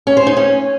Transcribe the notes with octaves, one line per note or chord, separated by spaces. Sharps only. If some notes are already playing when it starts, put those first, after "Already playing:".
C#4
C5
D#4
C#4